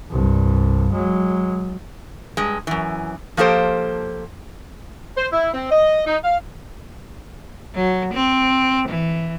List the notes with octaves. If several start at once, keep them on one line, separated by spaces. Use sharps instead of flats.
C2 G2
F#3 G#3
G2 G#3
F#2 E3
F3 A#3 G4 A4 C5
C5
E4
C4
D#5
D#4
F5
F#3
C4
E3